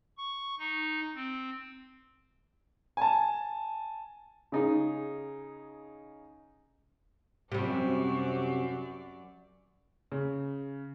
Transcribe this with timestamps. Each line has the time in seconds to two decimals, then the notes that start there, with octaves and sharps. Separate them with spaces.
0.18 C#6
0.59 D#4
1.15 C4
2.97 G#5 A5
4.52 C#3 D#4 G#4
7.52 F#2 C3 F#3 G3 D5
10.12 C#3